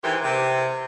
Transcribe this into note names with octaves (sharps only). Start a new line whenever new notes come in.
G#2 D#3 E3 G4 C5
C3